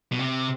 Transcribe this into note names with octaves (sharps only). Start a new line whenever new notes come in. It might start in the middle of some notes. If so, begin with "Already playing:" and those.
B2
C3